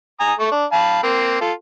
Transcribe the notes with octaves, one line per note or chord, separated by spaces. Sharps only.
G#5 A#5 D#6
A3 C#6
D4
F5 A5 B5
A#3 C4
F4 A4